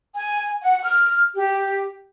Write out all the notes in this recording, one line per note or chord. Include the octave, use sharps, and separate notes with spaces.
G#5
F#5
F6
G4